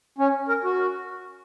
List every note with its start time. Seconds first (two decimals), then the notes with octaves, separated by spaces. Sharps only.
0.18 C#4
0.48 A#4
0.64 F#4